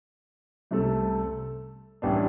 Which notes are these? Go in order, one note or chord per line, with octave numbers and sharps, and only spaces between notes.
C2 C3 A3 C4 A4
A1 A2 E3 G3 D4